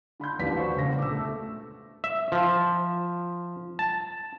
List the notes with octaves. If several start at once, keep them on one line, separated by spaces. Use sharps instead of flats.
D3 B5 C6 G6
A1 D#2 F3 B4 D5 B6
F#4 B4 C5
C#2 A#2 D3 A#6
D6 E6
A3
E5
F3
A5